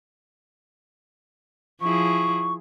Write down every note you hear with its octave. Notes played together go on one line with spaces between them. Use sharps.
F3 E4 G#4 C#6